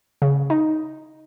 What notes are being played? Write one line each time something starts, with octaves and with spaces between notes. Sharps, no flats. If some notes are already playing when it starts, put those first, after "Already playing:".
C#3
D#4